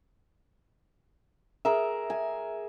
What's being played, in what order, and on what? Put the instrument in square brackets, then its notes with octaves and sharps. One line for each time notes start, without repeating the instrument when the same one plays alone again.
[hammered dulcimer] G#4 A#4 [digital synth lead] E5
[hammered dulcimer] G#5